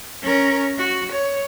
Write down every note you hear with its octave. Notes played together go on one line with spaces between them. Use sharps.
C#4 A#4
F#4
C#5